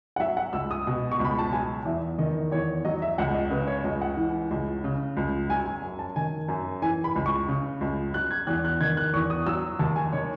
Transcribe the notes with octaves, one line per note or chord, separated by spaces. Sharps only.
F#5
F#3 E5
F#5
C#2 E6
D#6
B2
C#6
C#2
B5
A5
F#3 G#5
E2 E5
D#3 D#5
E2 C#5
F#3 D#5
E5
C#2 F#5
D#5
C#3 B4
C#5
C#2 D#5
F#5
E3
C#2
C#3
C#2
F#3 G#5
G#5
F#2
A5
D#3 G#5
F#2
E3 G#5
B5
C#2
C#6
C#3
C#2
F#3 F#6
G#6
E2 F#6
F#6
D#3 G#6
F#6
E2 C#6
D#6
F#3 E6
D#2 A5
G#5
D#3 C#5